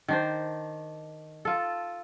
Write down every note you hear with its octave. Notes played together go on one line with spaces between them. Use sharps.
D#3 D4 C5
F4 A4